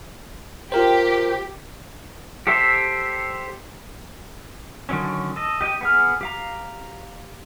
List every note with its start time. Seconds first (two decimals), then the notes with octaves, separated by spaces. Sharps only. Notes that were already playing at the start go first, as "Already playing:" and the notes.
0.72 F4 G4 A#4 C5
2.47 G4 A4 C5 E5
4.89 D3 D#3 F#3 C#4
5.36 A4 D#5
5.61 G4 D#5 G5
5.81 B3 G#4 F6
6.21 G4 F5 A#5